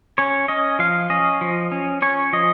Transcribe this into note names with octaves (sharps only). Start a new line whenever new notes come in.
C#4 C#5
C#4 D#5
F3 F5
C#4 D#5
F3
C#4
C#4 C#5
F3 D#5